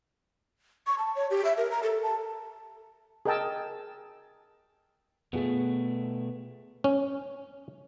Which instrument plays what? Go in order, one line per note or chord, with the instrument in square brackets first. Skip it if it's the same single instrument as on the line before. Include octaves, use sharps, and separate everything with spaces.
[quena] C#6
A5
C#5
G4
E5
A#4
A#5
A4
A5
[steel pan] G#4 A#4 D#5 G5 A5 E6
[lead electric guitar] B2 A3 [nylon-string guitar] B3 F4 G#4
[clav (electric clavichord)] C#4